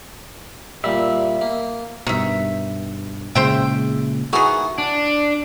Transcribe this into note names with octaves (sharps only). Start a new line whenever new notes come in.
A#2 G3 E5
A#3
G2 B2 D#3 E5
A#2 C#3 G#3 C4 C5 E5 G5
D#3 E3 F#4 G#4
D4